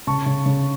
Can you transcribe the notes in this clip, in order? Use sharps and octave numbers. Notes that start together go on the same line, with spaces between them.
C#3 A5 C#6
C#3
C#3